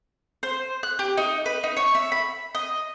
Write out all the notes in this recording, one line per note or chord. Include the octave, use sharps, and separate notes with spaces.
C5
F#6
G4
D#4
B4
D#4
C#5
E5
B5
D#5